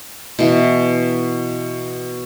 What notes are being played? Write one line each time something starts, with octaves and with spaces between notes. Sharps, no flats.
B2 E3